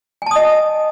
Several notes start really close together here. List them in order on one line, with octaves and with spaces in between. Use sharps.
G#5 A5 D#6 D#5